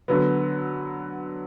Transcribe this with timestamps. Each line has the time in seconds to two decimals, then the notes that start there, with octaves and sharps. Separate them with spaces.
0.08 D3 F#3 B3